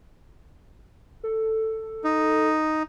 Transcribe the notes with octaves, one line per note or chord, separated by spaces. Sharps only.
A4
D#4